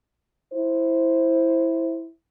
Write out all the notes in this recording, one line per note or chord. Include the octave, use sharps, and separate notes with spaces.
E4 C5